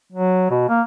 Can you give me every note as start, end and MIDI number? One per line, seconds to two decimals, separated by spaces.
0.12 0.47 54
0.50 0.65 47
0.69 0.82 58